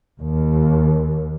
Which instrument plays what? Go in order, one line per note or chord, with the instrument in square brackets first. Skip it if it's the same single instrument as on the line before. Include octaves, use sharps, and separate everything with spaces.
[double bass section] D#2